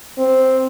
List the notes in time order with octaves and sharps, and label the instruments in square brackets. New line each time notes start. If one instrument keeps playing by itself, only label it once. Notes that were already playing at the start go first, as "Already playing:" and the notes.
[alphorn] C4